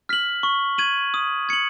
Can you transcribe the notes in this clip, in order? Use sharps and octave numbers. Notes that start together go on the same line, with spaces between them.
F6 B6 F#7
C#6
G#6 D#7 F#7
D#6
G#6 C#7 F#7